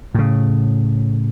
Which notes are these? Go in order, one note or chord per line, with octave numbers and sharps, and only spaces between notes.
A2 C#3